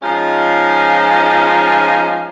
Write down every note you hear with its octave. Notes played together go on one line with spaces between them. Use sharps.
F3 G#3 C#4 D#4 F4